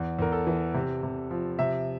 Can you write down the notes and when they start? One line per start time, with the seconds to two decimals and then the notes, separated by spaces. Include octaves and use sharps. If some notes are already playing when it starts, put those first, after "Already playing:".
Already playing: E2
0.19 E2 A#4
0.32 A4
0.47 E3
0.74 C3
1.03 C3
1.31 F3
1.59 C3 E5